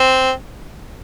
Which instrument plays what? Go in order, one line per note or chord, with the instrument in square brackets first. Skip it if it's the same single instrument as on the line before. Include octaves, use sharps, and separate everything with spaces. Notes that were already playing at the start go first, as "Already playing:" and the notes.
Already playing: [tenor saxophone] C4